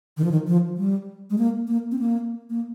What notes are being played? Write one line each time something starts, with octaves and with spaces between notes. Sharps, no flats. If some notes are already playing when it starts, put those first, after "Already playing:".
D#3
F3
D#3
F3
G3
G#3
A#3
A#3
C4
A#3
A#3